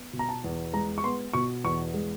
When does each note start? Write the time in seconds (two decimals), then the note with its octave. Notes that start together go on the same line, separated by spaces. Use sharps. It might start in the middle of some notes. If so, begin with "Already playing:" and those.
Already playing: B3
0.13 B2
0.19 A#5
0.29 A5
0.44 E2
0.73 G#3 A#5
0.98 C#6
1.04 B3 C6
1.33 B2 C#6
1.64 E2 C#6
1.94 G#3